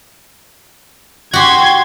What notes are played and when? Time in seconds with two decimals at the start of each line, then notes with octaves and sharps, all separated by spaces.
1.33 F#4 G4 C6 G#6